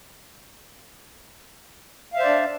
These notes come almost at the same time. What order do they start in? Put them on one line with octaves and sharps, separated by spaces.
F5 E5 C5 D5 D4